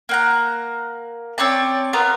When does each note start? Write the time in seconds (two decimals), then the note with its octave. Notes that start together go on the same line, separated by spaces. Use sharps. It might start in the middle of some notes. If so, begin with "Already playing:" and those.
0.09 A#3 F#5 A#5
1.38 C4 C#5 D5 A5
1.93 B3 F4 A#4